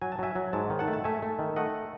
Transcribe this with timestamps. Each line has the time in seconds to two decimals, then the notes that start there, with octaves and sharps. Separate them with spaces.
0.02 F#3 G#5
0.12 A5
0.19 F#3 E5 G#5
0.35 F#3
0.53 G#2 A5
0.70 D#3
0.79 F#5 A5
0.88 A3
0.93 A5
1.04 A3 E5 G#5
1.22 A3
1.39 D#3
1.56 A3 D#5 F#5